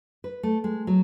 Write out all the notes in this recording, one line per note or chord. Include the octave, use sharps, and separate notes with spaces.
B4
A3
G#3
F#3